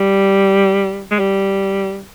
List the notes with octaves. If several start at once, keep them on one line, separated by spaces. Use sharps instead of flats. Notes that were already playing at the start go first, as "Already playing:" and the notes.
Already playing: G3
G#3
G3